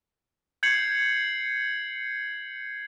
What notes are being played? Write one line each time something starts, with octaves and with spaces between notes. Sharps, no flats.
G6 G#6 C7 C#7 F#7